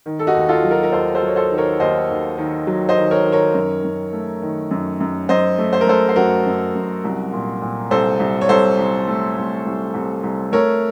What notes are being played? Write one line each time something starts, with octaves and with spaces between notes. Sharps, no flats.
D#3
A4
D#4 F#4
D#2
F4 A4
F#3
F#4 A#4
A#4
D#2 A4 C5
A4 C5
F#3 C#5
A4 C5
D#3
A#4 C#5
D#2 C5 D#5
D#2
D#3
F#3
C5 D#5
D#3
A#4 C#5
D#3
A#4 C#5
F#2
F#2
A3
D#3
F#2
F#2
F#2 C5 D#5
A3
C5
A#4
A3 A4 C5
C5
F#2 F#4 A#4
F#2
F#2
C2
A#2
A#2
C2 A4 C5
C2
C#5
C2 A4 C5
C2
A3
C2
C2
C2
C2
A3 A#4 C#5